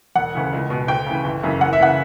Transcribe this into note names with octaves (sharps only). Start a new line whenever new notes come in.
E1 F#5
D2 C#3 E3
C#2
B2
D2 G5
C#3 E3
G1
F#2 C#3 E3
F#1 F#5
E5
C#3 E3 F#5